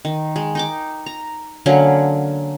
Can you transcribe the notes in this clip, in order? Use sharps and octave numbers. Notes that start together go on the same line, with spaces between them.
D#3
G#3
D#4 G5 D6
A#5
D3 F#3 A#3 C#4